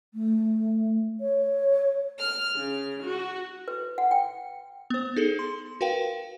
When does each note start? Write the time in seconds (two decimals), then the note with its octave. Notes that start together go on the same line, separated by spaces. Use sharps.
0.14 A3
1.21 C#5
2.19 F6
2.55 C#3
3.05 F#4
3.68 B4
3.98 F#5
4.11 G5
4.90 B3 C5
5.16 D#4 G#4 A4
5.39 C6
5.81 F#4 A#4 B4 F5 G5